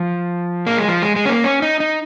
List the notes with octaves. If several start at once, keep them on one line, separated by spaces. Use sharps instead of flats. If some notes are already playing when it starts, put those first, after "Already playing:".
Already playing: F3
A#3
G#3
F3
G#3
G#3
C#4
A#3
C#4
D#4
D#4